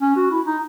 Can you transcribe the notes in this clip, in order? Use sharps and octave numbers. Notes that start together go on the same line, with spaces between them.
C#4
F#4
E4
D#4